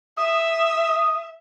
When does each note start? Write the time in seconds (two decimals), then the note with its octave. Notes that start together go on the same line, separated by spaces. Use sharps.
0.17 E5 D#6